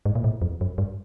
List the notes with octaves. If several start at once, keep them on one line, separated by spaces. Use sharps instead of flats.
G#2
A#2
A2
F2
F#2
G2